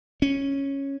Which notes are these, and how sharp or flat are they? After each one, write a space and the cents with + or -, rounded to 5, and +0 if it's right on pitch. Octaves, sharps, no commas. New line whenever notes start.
C#4 -5